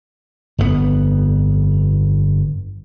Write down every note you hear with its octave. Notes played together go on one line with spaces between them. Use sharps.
G1 F2 A2 B3